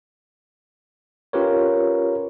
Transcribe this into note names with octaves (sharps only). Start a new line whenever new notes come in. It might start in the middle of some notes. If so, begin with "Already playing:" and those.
C#4 F4 G4 A#4 B4 C#5